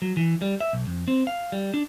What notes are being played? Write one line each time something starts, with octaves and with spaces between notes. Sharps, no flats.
F#3
E3
G3
E5
B1
F2
C4
F5
G3
D4